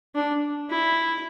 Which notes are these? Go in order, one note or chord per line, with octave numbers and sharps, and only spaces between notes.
D4
E4